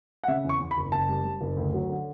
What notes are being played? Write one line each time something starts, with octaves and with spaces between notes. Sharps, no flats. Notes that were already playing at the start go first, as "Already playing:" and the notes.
F#5
C#3 E5
E2
C#6
E2
B5
F#1
F#1 A5
G3
G3
F#1
D2
F#3
D3